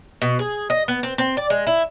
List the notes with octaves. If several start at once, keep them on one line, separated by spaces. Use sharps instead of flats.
B2
G#4
D#5
B3
C4
C4
D5
G#3
E4